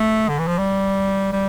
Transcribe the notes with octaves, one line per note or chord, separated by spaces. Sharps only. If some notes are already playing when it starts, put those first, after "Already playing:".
Already playing: A3
D3
E3
F3
G3
G3